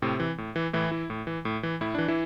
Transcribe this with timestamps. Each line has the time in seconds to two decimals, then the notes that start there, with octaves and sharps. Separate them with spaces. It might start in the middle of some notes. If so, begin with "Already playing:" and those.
0.02 A2 C3 C4
0.20 E3
0.38 A2
0.56 E3
0.73 A2 E3 E4
0.92 E3
1.10 A2
1.27 E3
1.45 A2
1.63 E3
1.81 A2 E4
1.94 E3 D4
2.08 E3 E4